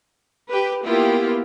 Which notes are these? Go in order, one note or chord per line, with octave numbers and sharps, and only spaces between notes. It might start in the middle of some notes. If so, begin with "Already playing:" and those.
G4 B4
A#3 B3 E4 F4 G4